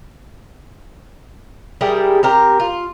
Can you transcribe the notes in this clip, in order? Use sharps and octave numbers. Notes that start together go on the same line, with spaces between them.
G3 E4 G#4 A#4
C4 G4 A#4
F4